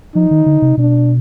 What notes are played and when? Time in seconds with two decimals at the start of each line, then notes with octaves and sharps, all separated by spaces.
0.15 F3 D#4
0.31 D#3
0.46 D3
0.62 C3
0.77 B2 D4